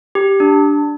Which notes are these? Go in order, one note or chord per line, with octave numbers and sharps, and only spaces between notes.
G4
D4